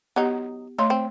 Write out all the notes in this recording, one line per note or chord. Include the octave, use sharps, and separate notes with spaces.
F#3 B3 D#4 G4
A3 D#4 C#5 C6
C4